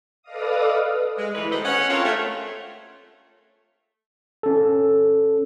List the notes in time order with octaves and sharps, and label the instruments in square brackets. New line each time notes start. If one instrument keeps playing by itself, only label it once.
[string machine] A4 B4 D5 D#5 F5 D#6
[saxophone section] G#3
D2 E3 B4
B2 D#3 A4 B4 C5 D#5
C#4 F#5
C4 D4 F4 A#4 C#5
A3
[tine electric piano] C#4 A4